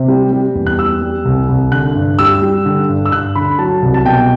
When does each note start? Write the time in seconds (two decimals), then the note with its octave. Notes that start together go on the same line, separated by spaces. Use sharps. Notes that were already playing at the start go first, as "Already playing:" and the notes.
Already playing: C3
0.08 G3
0.32 G3
0.55 E2
0.67 F#6
0.78 G3 E6
1.02 G3
1.25 C2
1.49 C2
1.71 D3 F#6
1.95 G2
2.19 G3 E6
2.42 G3
2.65 D3
2.89 G2
3.06 E6
3.12 G2 F#6
3.35 D3 B5
3.59 F#3 A5
3.82 C2
3.94 A5
4.05 B2 G5